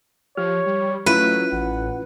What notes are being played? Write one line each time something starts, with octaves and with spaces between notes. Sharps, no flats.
F3 G4 C#5 F6
G3
F#3 A3 C#4 E4 F4 B4
A1 F#5